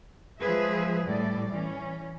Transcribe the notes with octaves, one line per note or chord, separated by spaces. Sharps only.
F3 G#3 G#4 B4 E5
A2 G3 D5
E3 C#4